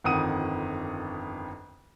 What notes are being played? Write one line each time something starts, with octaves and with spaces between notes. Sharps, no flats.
G1 F2 D#3 F#5 D#6 D#7